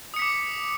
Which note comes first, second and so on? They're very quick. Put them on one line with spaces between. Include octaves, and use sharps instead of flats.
D#6 C#7 B6 D6